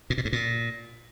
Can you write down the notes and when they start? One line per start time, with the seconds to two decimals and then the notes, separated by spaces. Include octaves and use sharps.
0.10 A#2
0.18 B2
0.25 G#2
0.33 A#2